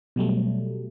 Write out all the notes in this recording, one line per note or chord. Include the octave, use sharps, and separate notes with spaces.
B2 F#3 G3 A3